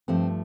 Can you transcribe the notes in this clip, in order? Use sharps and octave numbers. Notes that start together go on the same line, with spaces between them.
G2 F3 A3 C4